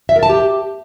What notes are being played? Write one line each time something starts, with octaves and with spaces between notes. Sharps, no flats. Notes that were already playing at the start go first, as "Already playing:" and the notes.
E5
A#4
A5
G4